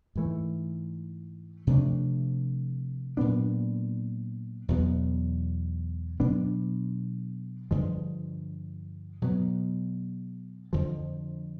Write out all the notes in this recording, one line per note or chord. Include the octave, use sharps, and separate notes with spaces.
G#2 E3 A3
C3 F3 A3 D4
A#2 F#3 B3 D4
E2 B2 F#3 B3
B2 F#3 B3 D4
G2 D3 F3 G#3
B2 F#3 B3
F2 D3 F3